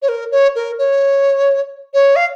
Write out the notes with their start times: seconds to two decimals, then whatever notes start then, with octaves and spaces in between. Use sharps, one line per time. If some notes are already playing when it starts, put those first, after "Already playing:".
0.02 C#5
0.09 A#4
0.31 C#5
0.55 A#4
0.78 C#5
1.94 C#5
2.16 F5